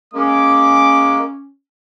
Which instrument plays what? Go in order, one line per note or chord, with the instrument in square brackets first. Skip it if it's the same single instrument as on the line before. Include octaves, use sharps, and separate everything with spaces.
[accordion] G#3 A#3 [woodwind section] C#4 [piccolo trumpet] D6